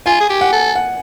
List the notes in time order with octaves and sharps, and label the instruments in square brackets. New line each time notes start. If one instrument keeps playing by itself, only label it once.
[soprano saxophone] F4 [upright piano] G#5
[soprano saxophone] G#4
G4
[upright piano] F#5
[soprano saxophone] A4
[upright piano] F#5